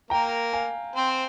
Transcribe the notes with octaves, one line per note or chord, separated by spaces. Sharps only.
A#3 A#4 G5 A#5
F5 G#5
C4 C5